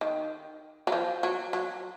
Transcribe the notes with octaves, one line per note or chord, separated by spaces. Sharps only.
D#3
F#3
F3
F#3
F#3